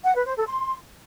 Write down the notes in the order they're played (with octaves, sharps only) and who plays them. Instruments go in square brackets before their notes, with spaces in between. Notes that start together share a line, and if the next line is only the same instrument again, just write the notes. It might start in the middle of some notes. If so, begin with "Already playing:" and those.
[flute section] F#5
B4
C5
A4
C6